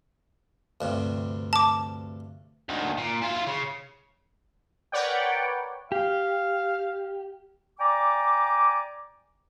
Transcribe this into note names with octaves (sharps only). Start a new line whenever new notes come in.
D2 G2 C3
A5 D6
D2 D#3
A#2
E4 F4
C#3
A#4 B4 C#5 D5 F#5 G5
G4 F5
D5 G5 G#5 A#5 D6